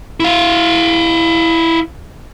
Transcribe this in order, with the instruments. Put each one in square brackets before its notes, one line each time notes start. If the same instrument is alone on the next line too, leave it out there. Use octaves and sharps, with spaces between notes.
[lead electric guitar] E4 F5